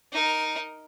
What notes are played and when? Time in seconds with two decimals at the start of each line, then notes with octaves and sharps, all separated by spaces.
0.12 D#4 A#4